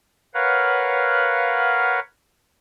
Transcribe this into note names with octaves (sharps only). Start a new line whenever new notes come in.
A#4 B4 C#5 F5 F#5